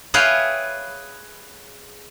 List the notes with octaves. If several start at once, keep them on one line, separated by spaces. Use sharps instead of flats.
G#4 B4 C#5 E5 F5 G5